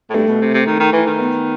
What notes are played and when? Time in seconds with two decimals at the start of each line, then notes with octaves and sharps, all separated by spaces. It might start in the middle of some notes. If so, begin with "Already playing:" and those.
0.10 A2
0.14 G2 A3
0.28 B2
0.41 C3
0.54 C3
0.66 D#3
0.80 D#3
0.92 E3
1.06 D#3
1.19 B3